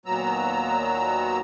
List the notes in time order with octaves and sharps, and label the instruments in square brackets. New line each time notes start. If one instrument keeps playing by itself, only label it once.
[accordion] D#2 A#2 F#3 B3 A#5 E6